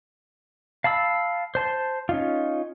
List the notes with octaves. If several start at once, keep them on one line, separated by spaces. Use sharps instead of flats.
F5 A5 B5 E6
C5 A5 C6
C#4 D#4 F4